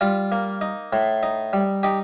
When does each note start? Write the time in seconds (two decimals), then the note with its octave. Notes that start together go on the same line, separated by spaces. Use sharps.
0.01 G3 F4
0.32 A#3
0.61 D#4
0.93 A2
1.23 D#4
1.53 G3
1.83 D#4 G4